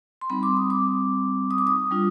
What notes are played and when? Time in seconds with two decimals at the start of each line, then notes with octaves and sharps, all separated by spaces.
0.21 C6
0.30 G3 C4 D#4 B5
0.43 D6
0.57 D#6
0.70 D6
1.51 D#6
1.58 D6
1.67 D#6
1.91 G3 D4 F4